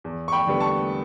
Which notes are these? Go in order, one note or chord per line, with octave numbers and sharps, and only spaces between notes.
E2
C#6
G5 B5
D3 G3 B3
A5 C#6